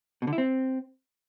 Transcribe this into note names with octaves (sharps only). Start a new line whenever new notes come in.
B2
D3
E4
C4